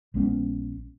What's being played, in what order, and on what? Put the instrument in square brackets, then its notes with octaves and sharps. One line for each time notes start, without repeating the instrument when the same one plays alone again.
[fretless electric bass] A#1 G#3 B3 C#4